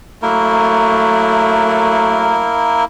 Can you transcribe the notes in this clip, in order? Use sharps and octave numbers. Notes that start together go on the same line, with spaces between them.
F#3 A3 A#3 E4 A#4